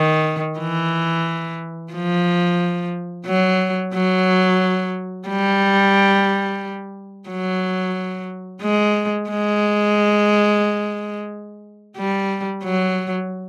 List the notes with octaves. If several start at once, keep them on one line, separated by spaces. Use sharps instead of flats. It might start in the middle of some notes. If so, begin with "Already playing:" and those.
Already playing: D#3
E3
F3
F#3
F#3
G3
F#3
G#3
G#3
G3
F#3